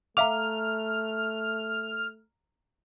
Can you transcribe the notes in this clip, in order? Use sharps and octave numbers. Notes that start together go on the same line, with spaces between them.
A3 E5 F5 A#5 D6 F6 F7